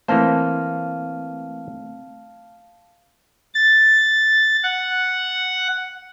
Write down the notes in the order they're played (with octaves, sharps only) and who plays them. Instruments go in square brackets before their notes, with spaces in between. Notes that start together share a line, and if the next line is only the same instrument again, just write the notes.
[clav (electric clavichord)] E3 A#3 C5 [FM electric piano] A3 C4 [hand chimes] F5 A5 F6
[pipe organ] A6
F#5